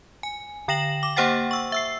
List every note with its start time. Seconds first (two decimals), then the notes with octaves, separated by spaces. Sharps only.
0.23 G#5
0.68 D3 G5 A#6 E7 F#7
1.03 D6
1.16 A#3 G4 C5 F#5 G5 A6
1.51 C#6 E6
1.72 E5 E6 C7